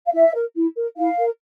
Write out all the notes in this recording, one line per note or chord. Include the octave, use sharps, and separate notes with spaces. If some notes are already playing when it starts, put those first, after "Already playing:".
F5
E4 E5
A#4
E4
A#4
E4 F5
A#4